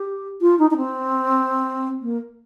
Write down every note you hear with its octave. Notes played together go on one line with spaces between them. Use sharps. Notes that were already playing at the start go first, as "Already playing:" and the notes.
Already playing: G4
F4
D#4
D#4
C4
A#3